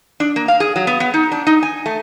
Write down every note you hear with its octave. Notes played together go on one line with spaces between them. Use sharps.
D4
A#3
F5
G#4
F#3
B3
B3
D#4
D4
D#4
G#5
A3